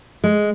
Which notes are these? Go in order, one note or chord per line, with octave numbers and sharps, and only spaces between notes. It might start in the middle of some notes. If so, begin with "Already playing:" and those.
G#3